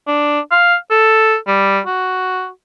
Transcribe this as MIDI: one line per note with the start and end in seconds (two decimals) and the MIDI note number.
0.07 0.40 62
0.52 0.75 77
0.91 1.37 69
1.47 1.80 55
1.87 2.49 66